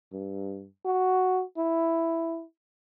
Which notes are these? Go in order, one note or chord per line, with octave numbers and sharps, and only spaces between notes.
G2
F#4
E4